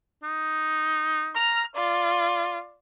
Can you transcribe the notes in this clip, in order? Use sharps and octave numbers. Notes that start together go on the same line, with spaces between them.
D#4
A#5 F6
F4 D5